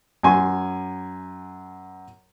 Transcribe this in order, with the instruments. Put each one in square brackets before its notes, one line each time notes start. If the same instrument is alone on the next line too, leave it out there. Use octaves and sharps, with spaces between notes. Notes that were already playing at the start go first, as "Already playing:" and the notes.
[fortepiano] F#2 G#5 C6